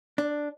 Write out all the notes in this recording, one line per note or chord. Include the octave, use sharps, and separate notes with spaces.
D4